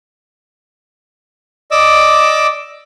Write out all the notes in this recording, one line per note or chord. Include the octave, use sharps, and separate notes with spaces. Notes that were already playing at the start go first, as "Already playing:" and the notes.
D5 D#5 D6 E6